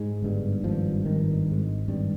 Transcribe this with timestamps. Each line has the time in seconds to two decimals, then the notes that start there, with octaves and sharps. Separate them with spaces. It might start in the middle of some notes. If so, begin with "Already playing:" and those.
Already playing: G#2 G#3
0.22 G1 G2
0.64 G#1 G2 F3
1.05 G#1 G2 D#3
1.47 G#1 G#2
1.88 G#1 G2 G3